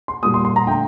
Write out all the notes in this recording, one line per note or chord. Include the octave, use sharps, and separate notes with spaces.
C6
A#2 G3 A#3 D#6
C6
C6
A#5
D3 A3 G5